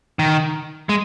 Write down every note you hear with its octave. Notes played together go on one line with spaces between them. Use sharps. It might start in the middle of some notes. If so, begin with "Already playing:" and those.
D#3
G#3